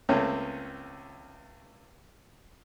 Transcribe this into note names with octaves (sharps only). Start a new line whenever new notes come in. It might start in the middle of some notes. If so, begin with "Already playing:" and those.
C#2 A3 A#3 C4 C#4